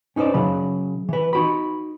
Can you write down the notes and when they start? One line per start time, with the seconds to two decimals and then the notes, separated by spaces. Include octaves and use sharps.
0.16 C#4 D#4 B4 C5 D5
0.34 C#3 F#3 B5
1.09 E3 B4
1.33 D#4 F#4 B5